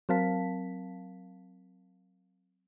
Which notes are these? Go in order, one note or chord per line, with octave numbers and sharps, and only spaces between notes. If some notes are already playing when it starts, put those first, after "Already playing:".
F#3 C4 A#4 F5 A5 B6